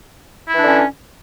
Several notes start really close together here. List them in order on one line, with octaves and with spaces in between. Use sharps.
E4 E3 D4 D3 C#4